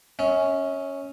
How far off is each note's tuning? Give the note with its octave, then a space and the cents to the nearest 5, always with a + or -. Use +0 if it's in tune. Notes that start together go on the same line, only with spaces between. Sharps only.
C#4 +0 E5 -45